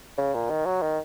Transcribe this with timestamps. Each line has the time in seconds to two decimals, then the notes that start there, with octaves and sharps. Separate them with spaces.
0.18 C#3
0.34 A#2
0.49 D#3
0.65 F#3
0.82 D#3